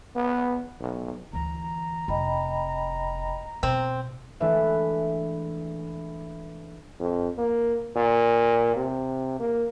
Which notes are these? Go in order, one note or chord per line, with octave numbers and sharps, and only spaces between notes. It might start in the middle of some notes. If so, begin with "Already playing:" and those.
B3
B1
D2 E3 A#5
F1 D#5 G5 B5
B2 C4
E3 G#3 A3 D4 B4 E5
F2
A#3
A#2
C3
A#3